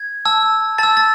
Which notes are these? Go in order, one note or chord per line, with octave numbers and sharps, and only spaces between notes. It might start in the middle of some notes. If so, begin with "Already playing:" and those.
Already playing: G#6
A5 E6
A5 E6 A6
A6